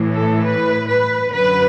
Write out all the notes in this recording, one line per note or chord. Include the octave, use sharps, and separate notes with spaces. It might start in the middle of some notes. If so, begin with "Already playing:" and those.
Already playing: A2 E3
A4
B4
B4
F#2 D3 F#3 B4